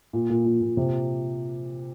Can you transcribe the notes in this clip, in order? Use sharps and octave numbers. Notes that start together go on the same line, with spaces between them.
A#2
A#2
A#2
A#2
C3